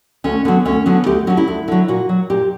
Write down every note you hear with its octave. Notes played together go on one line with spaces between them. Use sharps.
D2 C#4
D3 F#3 B3
D2 C#4
D3 F#3 B3
D2 G4
D3 F#3 C#4
E4
D2
D3 F#3
A#2 F#4
F#3
A#2 G4